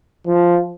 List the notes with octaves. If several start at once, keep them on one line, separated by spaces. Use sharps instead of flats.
F3